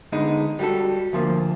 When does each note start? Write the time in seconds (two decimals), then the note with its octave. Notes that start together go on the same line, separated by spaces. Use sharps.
0.12 D3 G#3 B3 D#4
0.59 G3 F#4 A4
1.13 D2 F3 A#3